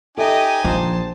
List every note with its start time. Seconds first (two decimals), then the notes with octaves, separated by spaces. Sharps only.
0.18 D#4 G4 A4 D#5 E5 G#5
0.65 A#1 F3 C5 A5